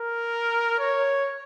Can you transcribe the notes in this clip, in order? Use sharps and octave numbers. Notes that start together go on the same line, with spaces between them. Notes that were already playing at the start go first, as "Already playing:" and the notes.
Already playing: A#4
C#5